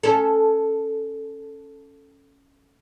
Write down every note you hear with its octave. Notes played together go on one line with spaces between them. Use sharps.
C#4 A4